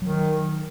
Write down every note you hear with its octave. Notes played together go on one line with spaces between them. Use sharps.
D#3 F#3